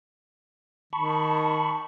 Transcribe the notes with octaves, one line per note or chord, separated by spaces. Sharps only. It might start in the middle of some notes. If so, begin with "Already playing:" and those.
D#3 A5 B5 C#6